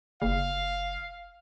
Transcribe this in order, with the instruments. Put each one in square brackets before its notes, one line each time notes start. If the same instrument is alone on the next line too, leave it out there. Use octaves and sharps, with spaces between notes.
[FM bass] F#1 [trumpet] F5